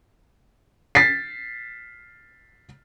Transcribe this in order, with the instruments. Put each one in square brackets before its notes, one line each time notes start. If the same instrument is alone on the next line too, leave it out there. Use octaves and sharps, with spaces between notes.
[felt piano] A6 B6 C7